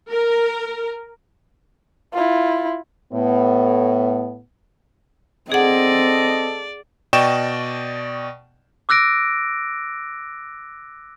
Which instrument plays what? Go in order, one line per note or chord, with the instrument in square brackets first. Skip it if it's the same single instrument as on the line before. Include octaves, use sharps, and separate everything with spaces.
[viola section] A#4
[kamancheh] E4 F4
[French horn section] A2 B3
[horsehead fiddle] C4 [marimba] G#4 F#5 [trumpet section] A4 D#5 [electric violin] D5
[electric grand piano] B2 D5 D#5 G5 C#6 E7
[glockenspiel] D6 E6 F#6 A#6 D7